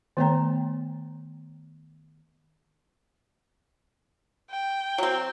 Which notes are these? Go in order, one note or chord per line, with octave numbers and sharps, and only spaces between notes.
D#3 A3 B3 C#5 G5 A#5
G5
F#3 C4